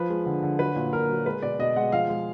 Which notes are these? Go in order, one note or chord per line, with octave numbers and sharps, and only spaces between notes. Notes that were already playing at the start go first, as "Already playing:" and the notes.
Already playing: F3 B4
G#3
D3
D3
F#3 B4
A#2
A#2 A#4
F#3
G#3 B4
B2 D5
B2 D#5
G#3 F#5
F3 F5
G#3